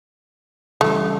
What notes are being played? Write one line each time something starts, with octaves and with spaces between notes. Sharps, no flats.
C#3 E3 G3 A3